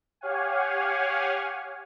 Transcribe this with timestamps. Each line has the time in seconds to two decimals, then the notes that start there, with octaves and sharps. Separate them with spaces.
0.21 G4 C#5 F5 F#5 G#5